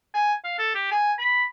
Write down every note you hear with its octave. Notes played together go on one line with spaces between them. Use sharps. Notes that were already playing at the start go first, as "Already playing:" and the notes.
G#5
F5
A4
G4
G#5
B5